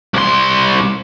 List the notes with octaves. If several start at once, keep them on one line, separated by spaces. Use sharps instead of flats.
C2 C6